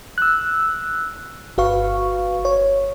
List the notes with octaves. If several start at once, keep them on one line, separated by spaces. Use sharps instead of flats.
E6 F#6
G1 F#4 B4 F5 C#6
C#5